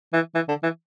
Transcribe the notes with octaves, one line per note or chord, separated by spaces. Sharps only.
E3
E3
D3
E3